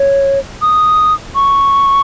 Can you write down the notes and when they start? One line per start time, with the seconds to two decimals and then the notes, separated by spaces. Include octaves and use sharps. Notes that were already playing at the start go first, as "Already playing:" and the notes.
Already playing: C#5
0.62 D#6
1.35 C#6